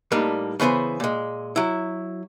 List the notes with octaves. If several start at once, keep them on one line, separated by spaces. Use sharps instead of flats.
A2 G3 A#3 D4 D#4
C#3 E3 B3 G#4 C5
A#2 G#3
F#3 E4